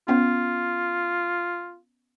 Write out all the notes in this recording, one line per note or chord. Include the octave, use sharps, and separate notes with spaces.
B3 C#4 F4